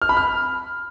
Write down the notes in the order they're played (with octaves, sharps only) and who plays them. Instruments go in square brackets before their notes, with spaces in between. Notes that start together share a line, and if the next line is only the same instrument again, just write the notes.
[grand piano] F6
B5
F6